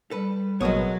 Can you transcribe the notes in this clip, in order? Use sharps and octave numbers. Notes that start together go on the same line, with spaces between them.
G3 A4 B4
A1 B2 F#3 G#3 A#3 C#5 D#6